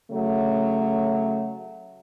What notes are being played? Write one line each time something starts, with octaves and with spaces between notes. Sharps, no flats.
C#3 F#3 A3